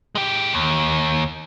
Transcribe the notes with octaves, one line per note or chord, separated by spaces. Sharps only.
G#3 G4
D#2